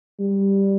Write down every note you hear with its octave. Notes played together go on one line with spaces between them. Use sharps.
G3